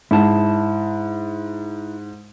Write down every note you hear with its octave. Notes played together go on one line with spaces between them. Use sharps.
G#2 E4 A5